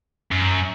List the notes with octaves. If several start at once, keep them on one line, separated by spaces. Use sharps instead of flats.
F#2